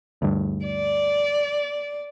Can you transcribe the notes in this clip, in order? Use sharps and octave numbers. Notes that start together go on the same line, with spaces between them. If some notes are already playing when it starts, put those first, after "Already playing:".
D2 G2
D5